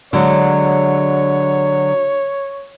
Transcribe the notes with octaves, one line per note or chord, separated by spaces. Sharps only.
D3 F#3 G#3 C#5